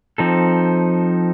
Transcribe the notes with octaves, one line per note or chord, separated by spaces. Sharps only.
F3 C4 D#4 A4